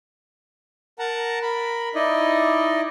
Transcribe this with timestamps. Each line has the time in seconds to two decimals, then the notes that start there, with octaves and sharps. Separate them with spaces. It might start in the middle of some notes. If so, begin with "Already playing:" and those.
0.99 A#4 F#5 A5 A#5
1.42 A#4 B5
1.95 D#4 E4 D5 D#5